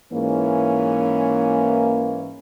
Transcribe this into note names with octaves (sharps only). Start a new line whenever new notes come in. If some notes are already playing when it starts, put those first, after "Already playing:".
G#2 E3 A#3 C#4